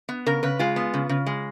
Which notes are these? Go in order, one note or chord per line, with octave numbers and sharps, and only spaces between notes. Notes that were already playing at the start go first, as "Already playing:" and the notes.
B3
C#3 A#4
C#3 B4
G#3 F4
B3
C#3
C#3
G#3